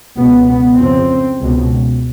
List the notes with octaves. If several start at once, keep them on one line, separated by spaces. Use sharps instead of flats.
C#2 B2 B3
B3
F2 C#3 C4
C#2 B2